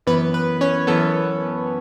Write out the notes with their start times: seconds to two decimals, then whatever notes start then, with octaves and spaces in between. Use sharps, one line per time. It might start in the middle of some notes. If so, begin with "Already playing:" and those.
0.07 F#2 E3 B3 B4
0.34 B4
0.61 C#4 C#5
0.87 F#2 E3 B3 A4